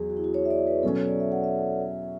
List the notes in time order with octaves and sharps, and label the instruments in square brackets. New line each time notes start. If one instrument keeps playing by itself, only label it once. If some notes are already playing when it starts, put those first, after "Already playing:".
Already playing: [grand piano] E2 F#3 [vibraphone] G#4
[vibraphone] F#4
E4
F#4
C#5
E5
D5
B4
[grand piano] B2 F#3 C#4 [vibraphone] A4
[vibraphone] C#5
D5
E5
F#5
E5
E5